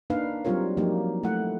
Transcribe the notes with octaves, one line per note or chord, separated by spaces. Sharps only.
A#3 D4 D#4 B4 F5
F#3 G3 C4 F4 A#4 C#5
F3 F#3 A#3 D#4 G4
A3 E4 F#5